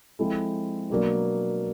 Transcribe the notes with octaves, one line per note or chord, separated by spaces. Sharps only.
F3 G#3 C4 E4 A4
B2 F#3 A#3 D4